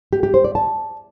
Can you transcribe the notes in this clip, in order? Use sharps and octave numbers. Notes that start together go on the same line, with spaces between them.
G4
G4
C5
D5
A5